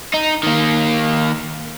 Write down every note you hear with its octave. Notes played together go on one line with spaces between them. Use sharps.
D#4
D#3 A#3